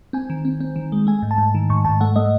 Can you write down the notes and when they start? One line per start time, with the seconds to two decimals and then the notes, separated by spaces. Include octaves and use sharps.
0.13 C4 G#5
0.30 D#3
0.45 C4
0.60 C4
0.76 D#3
0.92 G#3
1.07 A3 G#5
1.23 G#2
1.31 A5
1.38 G#2
1.55 D#3
1.69 G#2 C#6
1.85 G#2 A5
2.01 A3 F#5
2.16 A3 D#5